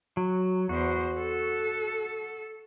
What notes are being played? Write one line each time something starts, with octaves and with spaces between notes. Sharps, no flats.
F#3
E2 F#4 C5
A4